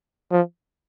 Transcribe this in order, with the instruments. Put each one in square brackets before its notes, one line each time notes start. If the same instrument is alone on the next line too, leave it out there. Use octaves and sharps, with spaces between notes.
[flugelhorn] F3